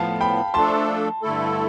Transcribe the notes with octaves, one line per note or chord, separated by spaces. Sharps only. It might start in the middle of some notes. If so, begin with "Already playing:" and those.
Already playing: A2 F3 B3 F5 A5
G5 B5
F3 A3 D4 A4 A5 C6
G2 D3 A3 E4 A4